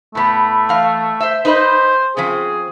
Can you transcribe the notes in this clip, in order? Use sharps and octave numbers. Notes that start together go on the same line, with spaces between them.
A2 A3 B3
E3 F5
C5 E5
D#4 B4 C5 D#5
F3 C4 C#4 G#4